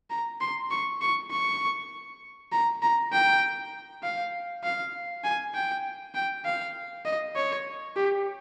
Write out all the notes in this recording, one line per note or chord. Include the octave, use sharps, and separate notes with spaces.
A#5
C6
C#6
C#6
C#6
A#5
A#5
G5
F5
F5
G#5
G5
G5
F5
D#5
C#5
G4